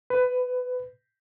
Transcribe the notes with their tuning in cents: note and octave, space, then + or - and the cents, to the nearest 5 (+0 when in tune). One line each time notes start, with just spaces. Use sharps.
B4 +20